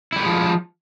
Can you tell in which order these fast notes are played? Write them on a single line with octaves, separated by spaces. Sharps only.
E4 G3 D#3 G#3 F3